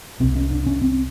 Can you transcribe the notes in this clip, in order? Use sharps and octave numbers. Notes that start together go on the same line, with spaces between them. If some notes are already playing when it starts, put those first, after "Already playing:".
C2 C3 C4
C#4
D4
C#4
C4